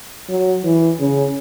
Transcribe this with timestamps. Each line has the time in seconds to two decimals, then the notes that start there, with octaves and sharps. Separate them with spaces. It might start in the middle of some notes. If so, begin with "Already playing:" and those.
0.29 F#3
0.64 E3
0.99 C#3